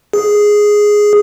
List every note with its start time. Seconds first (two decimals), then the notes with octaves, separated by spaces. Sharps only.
0.13 G#4